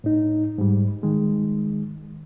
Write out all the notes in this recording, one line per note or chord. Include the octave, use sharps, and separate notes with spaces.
A2 D#4
G#2 G3
D#3 G#3